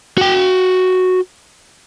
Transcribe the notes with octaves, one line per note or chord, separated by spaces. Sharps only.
F#4 G5